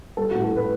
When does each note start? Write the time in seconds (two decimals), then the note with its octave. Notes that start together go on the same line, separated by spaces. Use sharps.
0.17 G3 A4
0.31 F#4
0.35 A2
0.44 A4
0.52 A2 B4